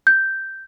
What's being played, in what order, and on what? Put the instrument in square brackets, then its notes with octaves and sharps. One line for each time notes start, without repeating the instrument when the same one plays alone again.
[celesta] G6